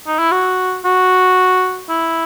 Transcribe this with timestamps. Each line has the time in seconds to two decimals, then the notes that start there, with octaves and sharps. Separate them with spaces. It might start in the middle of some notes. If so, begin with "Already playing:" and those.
0.07 D#4
0.19 E4
0.31 F#4
0.85 F#4
1.89 E4